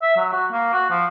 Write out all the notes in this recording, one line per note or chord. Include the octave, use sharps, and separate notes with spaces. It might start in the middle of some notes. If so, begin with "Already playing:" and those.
E5
F#3
F#4
A#3
F#4
F3